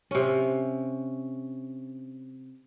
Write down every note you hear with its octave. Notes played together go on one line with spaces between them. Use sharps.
C3 C#4